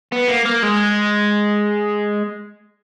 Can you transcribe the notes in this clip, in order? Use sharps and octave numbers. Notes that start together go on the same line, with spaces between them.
B3
A#3
A#3
G#3